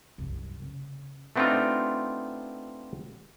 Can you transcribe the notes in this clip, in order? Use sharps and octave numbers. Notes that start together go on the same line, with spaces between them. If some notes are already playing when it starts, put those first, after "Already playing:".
C2 F#2
C#3
A3 B3 C4 D4 D#4 F4